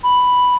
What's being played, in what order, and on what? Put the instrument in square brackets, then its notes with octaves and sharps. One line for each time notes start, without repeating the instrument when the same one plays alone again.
[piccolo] B5